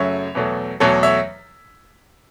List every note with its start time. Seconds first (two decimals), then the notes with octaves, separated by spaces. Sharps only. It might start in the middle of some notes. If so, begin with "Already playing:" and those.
Already playing: F#2 C#3 F#3 A3 C#5 E5
0.35 E2 B2 F#3 A3
0.80 E2 B2 F#3 A3 A4 C#5
1.03 C#5 E5